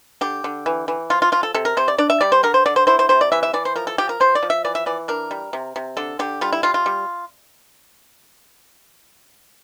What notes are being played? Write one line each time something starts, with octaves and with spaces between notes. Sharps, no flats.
D3 G4
D3
E3
E3
F3 F4
F4
F3 F4
A4
C3 A4
A#4
C3 C5
D5
D4 D5
E5
G3 D5
C5
D3 A#4
C5
D3 D5
C5
E4 C5
C5
C3 C5
D5
E3 E5
E5
E3 D5
C5
F3 A#4
A4
F3 G4
A#4
F3 C5
D5
F3
E5
E3 D5
E5
E3 D5
D4 A#4
G3
C3
C3
D3 A4
D3 G4
G3 F4
E4
G3 F4
F4
G3